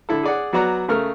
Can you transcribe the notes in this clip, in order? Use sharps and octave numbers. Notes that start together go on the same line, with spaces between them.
D3 E4 A4
G#4 D5 F#5
F#3 B3 F#4 D5 A#5 F#6
C#3 A3 A#4 F6